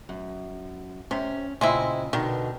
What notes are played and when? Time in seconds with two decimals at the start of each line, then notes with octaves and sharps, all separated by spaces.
0.09 F#2
1.11 C3 C#4
1.61 A#2 C#3 G#3 C4 E4 D#5
2.13 B2 D3 D#3